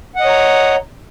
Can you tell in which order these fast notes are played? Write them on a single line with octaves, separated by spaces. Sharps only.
F#5 D#5 C#5 A#5